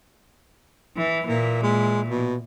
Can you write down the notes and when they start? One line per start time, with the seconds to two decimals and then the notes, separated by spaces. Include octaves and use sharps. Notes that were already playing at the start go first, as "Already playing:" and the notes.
0.97 E3
1.27 A#2 E3 A#3
1.63 G#3
2.10 B2